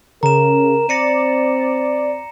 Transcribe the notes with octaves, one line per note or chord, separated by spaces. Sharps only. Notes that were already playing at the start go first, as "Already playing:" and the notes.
C#3 A#4 A#5 E7
C4 D5 A#6 C#7 D#7